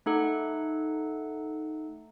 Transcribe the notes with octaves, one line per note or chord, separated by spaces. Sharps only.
A3 D#4 A4 F#5